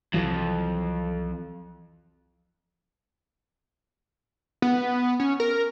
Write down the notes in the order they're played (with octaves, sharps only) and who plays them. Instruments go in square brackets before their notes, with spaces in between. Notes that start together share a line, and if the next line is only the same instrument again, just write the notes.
[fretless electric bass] C2 E3 F#3 [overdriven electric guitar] F2
[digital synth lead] B3
C#4
A#4